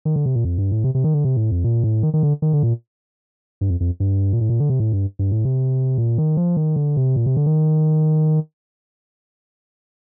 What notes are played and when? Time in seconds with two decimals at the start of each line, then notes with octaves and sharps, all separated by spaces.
0.05 D#3
0.16 D3
0.26 C3
0.36 A#2
0.45 F2
0.58 G2
0.72 A2
0.84 C3
0.95 C3
1.04 D#3
1.14 D3
1.24 C3
1.37 A2
1.51 F2
1.64 A#2
1.83 A2
2.03 D#3
2.14 D#3
2.23 D3
2.42 D#3
2.53 D3
2.63 A#2
3.61 G2
3.70 F2
3.80 F2
4.00 G2
4.33 A#2
4.41 A2
4.49 A#2
4.60 D3
4.70 C3
4.80 A2
4.92 G2
5.19 G2
5.31 A2
5.45 C3
5.98 A#2
6.18 D#3
6.37 F3
6.57 D#3
6.76 D3
6.97 C3
7.16 A#2
7.26 C3
7.37 D3
7.46 D#3